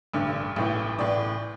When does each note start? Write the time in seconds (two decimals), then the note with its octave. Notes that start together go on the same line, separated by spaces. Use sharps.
0.14 A1 G2 D3
0.56 A1 A2 E3
0.98 A1 A2 E3 D5